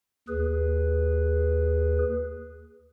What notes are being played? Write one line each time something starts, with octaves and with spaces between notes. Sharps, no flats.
D#2 G#4 B4